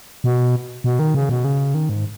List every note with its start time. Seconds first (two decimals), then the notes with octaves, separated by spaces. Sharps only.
0.24 B2
0.84 B2
0.99 D#3
1.15 C#3
1.29 B2
1.45 C#3
1.74 D#3
1.89 G#2